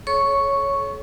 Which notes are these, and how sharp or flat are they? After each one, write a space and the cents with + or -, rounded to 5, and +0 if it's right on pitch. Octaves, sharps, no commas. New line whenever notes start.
A4 -40 C#5 +0 C#6 +0